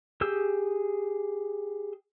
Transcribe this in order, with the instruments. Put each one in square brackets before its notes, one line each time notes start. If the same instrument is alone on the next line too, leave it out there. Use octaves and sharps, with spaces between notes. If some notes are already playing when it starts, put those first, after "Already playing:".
[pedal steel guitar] G4 G#4 E6 G6